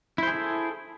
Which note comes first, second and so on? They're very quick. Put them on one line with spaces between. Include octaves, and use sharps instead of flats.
E4 C5 G#4 A4